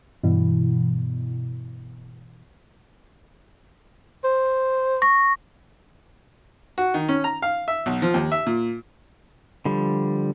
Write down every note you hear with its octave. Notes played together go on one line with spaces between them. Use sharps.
G2 B2 E3
C5
C#6 A#6
F#4
D#3
C#4
A#5
F5
E5
B1
F3
D#2
E5
A#2
D3 F3 G3